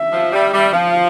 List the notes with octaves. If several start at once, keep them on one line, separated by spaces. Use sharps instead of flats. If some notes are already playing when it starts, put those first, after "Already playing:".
Already playing: E5
F3
G3
G3
F3 F5